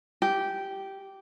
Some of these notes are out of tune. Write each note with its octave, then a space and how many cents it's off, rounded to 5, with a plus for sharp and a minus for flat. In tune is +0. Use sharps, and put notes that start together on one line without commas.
G4 -10